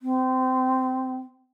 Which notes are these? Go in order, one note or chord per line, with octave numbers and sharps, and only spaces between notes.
C4